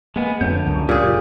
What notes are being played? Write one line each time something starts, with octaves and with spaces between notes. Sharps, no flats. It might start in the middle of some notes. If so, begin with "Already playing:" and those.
G#3 A#3 B3 G#5
F2 D3 A3 B3 C#5 G6
C#2 F#2
A#2 G4 G#4 G6
F1